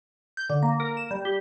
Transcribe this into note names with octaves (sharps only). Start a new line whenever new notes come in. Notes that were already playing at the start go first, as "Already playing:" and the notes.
G6
D3
A#3
A#4
E7
G3
G4